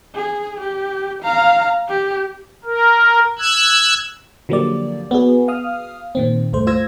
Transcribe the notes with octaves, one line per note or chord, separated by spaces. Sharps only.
G#4
G4
F5 A#5
G4
A#4
E6 F#6 G#6
D3 F3 F#3 A#3 G4 D5
B3 F#4 G#4
F5 D#6 F6
A#2 D#3 C4
C#2 G2 A3 C5
F4 C5 E6 G#6 A#6